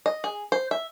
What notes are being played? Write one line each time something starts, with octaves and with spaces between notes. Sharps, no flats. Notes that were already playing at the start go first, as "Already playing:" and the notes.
D#5
G#4
C5
E5